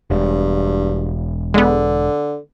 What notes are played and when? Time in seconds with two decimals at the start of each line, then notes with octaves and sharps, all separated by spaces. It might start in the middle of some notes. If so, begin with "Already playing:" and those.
0.10 E1 G2
1.54 D3 G#3 B3